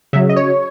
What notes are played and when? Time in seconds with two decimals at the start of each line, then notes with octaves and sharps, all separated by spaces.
0.13 C#3 F#3 E5
0.29 D#5
0.36 C#5